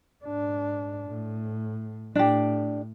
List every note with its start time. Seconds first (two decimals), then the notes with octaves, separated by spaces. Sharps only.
0.25 G#2 D4
1.07 A2
2.15 A2 D4 G4